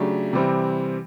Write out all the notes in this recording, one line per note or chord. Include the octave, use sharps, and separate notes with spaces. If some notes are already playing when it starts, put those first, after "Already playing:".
Already playing: C#3 F#3 A3 D4 G4
C3 E3 G3 C4